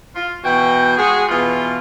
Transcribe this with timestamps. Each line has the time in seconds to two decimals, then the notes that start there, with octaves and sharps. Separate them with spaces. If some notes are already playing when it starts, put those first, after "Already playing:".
0.16 F4
0.44 B2 E3 F#4 G5
0.97 G#3 F#4 G#4
1.29 B2 E3 F4